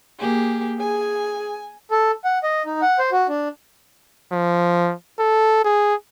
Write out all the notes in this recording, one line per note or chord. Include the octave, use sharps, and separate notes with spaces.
A#3 G4 G#4
G#4 G#5
A4
F#5
D#5
D#4
F#5
C5
F#4
D4
F3
A4
G#4